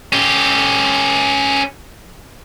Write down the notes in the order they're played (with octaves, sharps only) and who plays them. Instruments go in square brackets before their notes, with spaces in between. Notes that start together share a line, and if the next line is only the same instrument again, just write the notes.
[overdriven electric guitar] C#4 G4